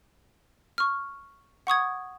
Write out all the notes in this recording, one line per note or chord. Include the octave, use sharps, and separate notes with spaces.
C#6 F6
F#5 C#6 D#6 G#6